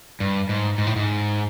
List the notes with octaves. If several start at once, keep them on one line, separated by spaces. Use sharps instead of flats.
G2
G#2
G#2
A2
G#2